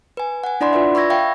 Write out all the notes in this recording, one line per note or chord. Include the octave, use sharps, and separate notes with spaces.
B4 G#5
F#5 G#5
D4 E4 D5 F#5 B5 C6
F4 B4 D5 E5
B5 C#6 E6 G#6 A#6
E5 F5 G5 B5 C#6